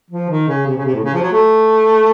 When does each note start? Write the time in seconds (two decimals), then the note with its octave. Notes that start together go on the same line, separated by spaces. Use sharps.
0.10 F3
0.29 D#3
0.48 C#3
0.66 C3
0.76 C#3
0.85 C3
0.95 A2
1.04 C#3
1.14 F3
1.22 F#3
1.32 A3